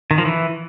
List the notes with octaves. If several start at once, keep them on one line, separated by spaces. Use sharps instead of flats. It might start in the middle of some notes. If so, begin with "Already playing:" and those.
D#3
F3
E3